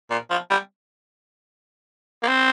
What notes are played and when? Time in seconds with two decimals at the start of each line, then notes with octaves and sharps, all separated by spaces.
0.10 A#2
0.30 F3
0.50 G3
2.23 A#3
2.28 C4